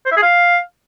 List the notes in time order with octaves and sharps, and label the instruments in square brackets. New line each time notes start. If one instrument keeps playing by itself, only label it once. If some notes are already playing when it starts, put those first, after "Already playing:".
[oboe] C5
E5
G#4
F5